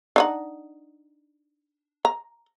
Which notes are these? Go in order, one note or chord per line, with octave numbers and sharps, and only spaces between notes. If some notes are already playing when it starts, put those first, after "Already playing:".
D4 D#4 F#5
A#5